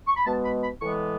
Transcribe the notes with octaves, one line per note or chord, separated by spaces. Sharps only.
C#6
B5
B2 G#3 B3 A5
B5
B5
A2 E3 G#3 B3 C#6